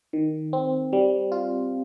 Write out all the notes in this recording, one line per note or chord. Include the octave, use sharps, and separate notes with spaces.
D#3
C4
G3
F4